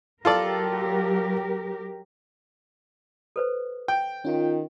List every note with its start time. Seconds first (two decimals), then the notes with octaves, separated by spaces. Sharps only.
0.25 F#3 F4 G4 A4 A#4 D5
3.36 A4 B4 C5
3.88 G5
4.25 D#3 C#4 F4